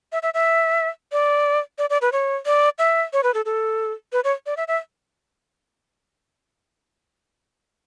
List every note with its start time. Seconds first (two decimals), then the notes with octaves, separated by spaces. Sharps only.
0.12 E5
0.23 E5
0.34 E5
1.12 D5
1.78 D5
1.90 D5
2.02 B4
2.12 C#5
2.46 D5
2.79 E5
3.13 C#5
3.23 B4
3.34 A4
3.45 A4
4.13 B4
4.24 C#5
4.46 D5
4.57 E5
4.68 E5